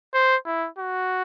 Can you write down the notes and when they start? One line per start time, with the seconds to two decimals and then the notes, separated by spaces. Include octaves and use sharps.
0.14 C5
0.46 E4
0.78 F#4